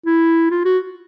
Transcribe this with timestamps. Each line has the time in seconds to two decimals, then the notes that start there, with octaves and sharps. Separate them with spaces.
0.06 E4
0.51 F4
0.65 F#4